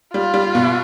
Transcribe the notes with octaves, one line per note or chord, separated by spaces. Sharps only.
G3 F4
G3
B2